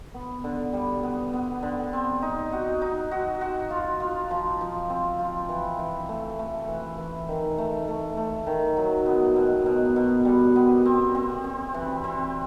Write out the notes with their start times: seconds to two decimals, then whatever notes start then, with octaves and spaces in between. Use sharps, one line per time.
0.14 B3
0.44 D3
0.73 G3
1.03 B3
1.34 B3
1.63 D3
1.93 C4
2.22 D#4
2.53 F#4
2.82 D#4
3.11 F#4
3.41 F#4
3.70 F4
4.00 F4
4.31 F3
4.61 F3
4.90 C4
5.19 F4
5.49 E3
5.79 E3
6.09 A3
6.39 A3
6.68 E3
6.98 E3
7.29 D#3
7.58 A3
7.88 A3
8.17 A3
8.47 D#3
8.77 F#3
9.06 B3
9.36 B2
9.66 B2
9.96 B2
10.25 G3
10.56 B3
10.85 C4
11.15 C4
11.44 C4
11.74 E3
12.04 C4